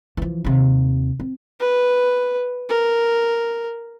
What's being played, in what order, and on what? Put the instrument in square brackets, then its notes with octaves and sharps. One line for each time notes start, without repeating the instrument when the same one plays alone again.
[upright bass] E3 F3
D#2 C3
C4
[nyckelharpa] B4
A#4